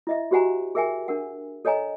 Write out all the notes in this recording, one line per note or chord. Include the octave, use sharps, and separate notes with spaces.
E4 D#5 E5
F#4 G4 C5 F#5 G#5 A#5
G#4 A#4 E5 G5 G#5
D4 A#4 F#5
A4 C#5 D#5 G#5 A#5